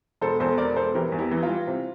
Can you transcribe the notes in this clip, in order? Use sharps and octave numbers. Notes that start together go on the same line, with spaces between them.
E1 A4 C5
E2 A4 C5
E1 A#4 D5
E1 A4 C5
E3 G4 A#4
E2
E4 G4
E3
F4
G3
C3